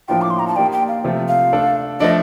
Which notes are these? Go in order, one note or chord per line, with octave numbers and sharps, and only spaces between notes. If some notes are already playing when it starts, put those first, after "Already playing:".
A2 F3 A#3 D4 F4 G5
D6
C6
A#5
A5
A#3 D#4 G4 D5 G5
G5
F5
C3 F3 A3 C4 F4
F5
A3 D4 A4
F3 A3 D4 D#5